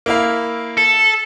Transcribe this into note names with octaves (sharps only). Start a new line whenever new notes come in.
A#3 E4 F5
A4